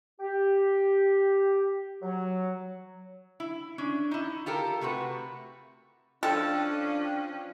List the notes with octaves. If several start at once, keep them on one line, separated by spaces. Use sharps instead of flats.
G4
F#3
E4
C#4 D4
D#4 E4
F4 G4 A4 A#4
C3 A3 F#4 B4
F3 C#4 D4 F4 A4 F5 G5